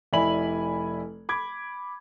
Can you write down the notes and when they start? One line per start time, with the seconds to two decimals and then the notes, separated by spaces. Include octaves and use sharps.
0.13 F1 E4 D5 G#5 B5 F#7
1.29 B5 D6 G#6